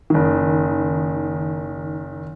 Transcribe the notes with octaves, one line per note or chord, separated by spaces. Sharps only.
F#1 D#3